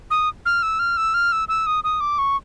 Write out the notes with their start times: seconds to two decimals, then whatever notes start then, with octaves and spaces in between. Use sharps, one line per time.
0.11 D#6
0.46 F6
0.63 E6
0.79 F6
0.97 E6
1.14 F6
1.32 E6
1.48 E6
1.67 D#6
1.84 D#6
2.01 D6
2.18 C#6